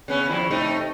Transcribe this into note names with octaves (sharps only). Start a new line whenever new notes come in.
C#3 B3 C#4
F3 G3 E4
C3 A3 D#4